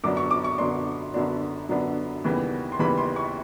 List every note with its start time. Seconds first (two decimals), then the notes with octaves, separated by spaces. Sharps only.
0.04 F#2 D3 F#3 B3 D4 D6
0.17 C#6
0.31 D6
0.44 C#6
0.58 F#2 D3 F#3 B3 D4 C6
1.14 F#2 D3 F#3 B3 D4
1.69 F#2 D3 F#3 B3 D4
2.24 D#2 C#3 E3 G3 B3
2.72 C6
2.79 D#2 C#3 E3 G3 B3 B5
2.98 C6
3.16 C#6